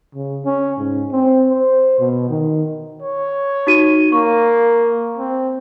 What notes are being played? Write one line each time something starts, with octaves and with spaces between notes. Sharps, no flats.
C#3
C#4
G#2
C4
C5
B2
D#3
C#5
D#4 F#4 D#7
A#3 C#6
C4